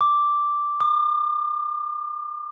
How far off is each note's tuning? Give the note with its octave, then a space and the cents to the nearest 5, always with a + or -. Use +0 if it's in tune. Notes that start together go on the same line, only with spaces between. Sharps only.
D6 -5
D6 +45